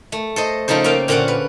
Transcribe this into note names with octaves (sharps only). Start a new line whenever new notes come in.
A3
A4 C5 D#5
C#3 F3 D#4 A4 C5
A#3 F4 E5 F5 G5
A#2 D3 C4 C#4 D5 F#5
B4